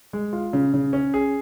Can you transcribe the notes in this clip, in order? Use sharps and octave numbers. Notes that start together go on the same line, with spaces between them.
G#3
F4
C#3
C#3
C#4
G#4